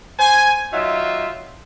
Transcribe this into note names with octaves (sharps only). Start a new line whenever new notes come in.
C5 G#5
F#3 D#4 F4 E5